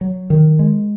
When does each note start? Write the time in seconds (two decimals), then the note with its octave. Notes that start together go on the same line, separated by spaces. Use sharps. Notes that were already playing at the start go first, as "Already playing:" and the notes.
0.01 F#3
0.30 D#3
0.59 G#3